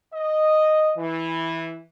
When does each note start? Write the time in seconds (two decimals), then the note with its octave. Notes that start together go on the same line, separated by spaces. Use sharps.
0.14 D#5
0.97 E3